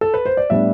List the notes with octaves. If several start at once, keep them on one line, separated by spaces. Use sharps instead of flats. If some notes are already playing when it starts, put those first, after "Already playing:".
A4
B4
C5
D5
A2 G3 B3 D4 E5